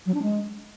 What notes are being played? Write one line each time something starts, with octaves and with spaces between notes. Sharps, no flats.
F#3
D4
G#3